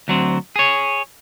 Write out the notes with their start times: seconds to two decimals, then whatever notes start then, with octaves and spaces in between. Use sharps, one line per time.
0.08 D2 F#3 C4
0.56 G#4 C#5